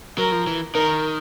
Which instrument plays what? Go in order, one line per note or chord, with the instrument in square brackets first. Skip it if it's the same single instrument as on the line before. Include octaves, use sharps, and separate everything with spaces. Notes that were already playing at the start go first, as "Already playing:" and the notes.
[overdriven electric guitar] F#3 [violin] A#4
[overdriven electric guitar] F3
E3
[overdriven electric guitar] D#3 [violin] A#4